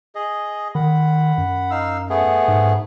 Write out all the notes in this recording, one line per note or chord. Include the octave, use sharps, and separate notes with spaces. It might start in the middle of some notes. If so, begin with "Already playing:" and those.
G#4 D#5
D#3 F#5 B5
F#2
D#4 F5 E6
A3 B3 G#4
G#2